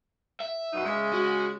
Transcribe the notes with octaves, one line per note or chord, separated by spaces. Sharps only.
E5
F#2 B2 D#4
C#3 G#3
F#4